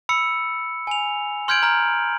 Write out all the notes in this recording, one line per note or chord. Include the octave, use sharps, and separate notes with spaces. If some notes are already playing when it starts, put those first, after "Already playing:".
B5 E6 C#7
G#5 F7
C6 F6 G6 G#6 D7 F#7
A#5 F6